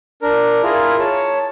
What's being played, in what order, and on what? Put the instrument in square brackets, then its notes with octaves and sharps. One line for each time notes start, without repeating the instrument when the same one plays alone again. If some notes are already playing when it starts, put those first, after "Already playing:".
[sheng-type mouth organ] D4 A#4
E4 F4 G#4 A#4
C#5 A5